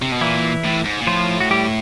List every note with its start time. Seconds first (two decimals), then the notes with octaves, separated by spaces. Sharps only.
0.02 C3
0.12 B2
0.21 A#2 E3 E4
0.65 A2
0.85 G#2
1.01 A#2
1.07 A2 F3 F4
1.40 F#4
1.50 G3 G4